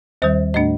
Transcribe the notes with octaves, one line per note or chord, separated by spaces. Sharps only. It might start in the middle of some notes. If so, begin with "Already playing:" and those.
D#2 D#3 G3 C5
A2 A3 D4 D#5